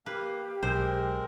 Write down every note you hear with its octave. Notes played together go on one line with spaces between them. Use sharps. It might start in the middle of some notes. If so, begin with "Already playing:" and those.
A#3 G4 B4 F5
B1 G#3 C4 A#4 C5